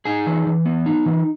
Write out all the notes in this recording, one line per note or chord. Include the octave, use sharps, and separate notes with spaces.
D#4 G#4 G#5
E3
E3
B3
D#4
E3